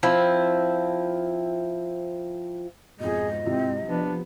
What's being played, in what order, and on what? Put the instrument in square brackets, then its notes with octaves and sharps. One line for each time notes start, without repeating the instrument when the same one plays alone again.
[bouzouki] F3 C4 E4
[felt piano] F2 B2 [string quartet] G#2 [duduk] G#4 [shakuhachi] D#5
[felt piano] C3 E4 F4 [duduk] C4
[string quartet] F3 B3 [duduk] D4